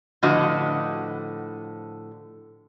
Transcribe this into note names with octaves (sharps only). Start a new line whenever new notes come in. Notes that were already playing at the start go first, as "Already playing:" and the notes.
A2 D3 F3 F#4 B4 D#5